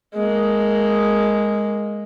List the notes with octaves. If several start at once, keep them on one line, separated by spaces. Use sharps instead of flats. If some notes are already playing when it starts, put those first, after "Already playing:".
G#3 A#3